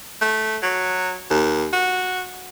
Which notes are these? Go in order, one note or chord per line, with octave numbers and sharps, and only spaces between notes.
A3
F#3
D#2
F#4